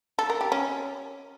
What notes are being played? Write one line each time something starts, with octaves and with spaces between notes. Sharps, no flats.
A4
A#4
G4
C#4